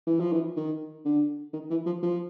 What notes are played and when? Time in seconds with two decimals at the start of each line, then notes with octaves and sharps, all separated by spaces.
0.06 E3
0.20 F3
0.32 E3
0.56 D#3
1.05 D3
1.53 D#3
1.70 E3
1.86 F3
2.03 F3